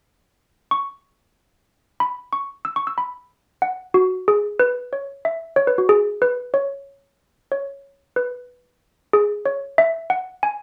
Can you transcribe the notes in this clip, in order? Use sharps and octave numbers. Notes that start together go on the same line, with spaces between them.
C#6
B5
C#6
E6
C#6
E6
B5
F#5
F#4
G#4
B4
C#5
E5
C#5
B4
F#4
G#4
B4
C#5
C#5
B4
G#4
C#5
E5
F#5
G#5